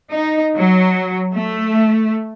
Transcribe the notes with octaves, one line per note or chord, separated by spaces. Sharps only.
D#4
F#3
A3